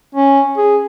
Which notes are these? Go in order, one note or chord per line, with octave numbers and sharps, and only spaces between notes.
C#4
G#4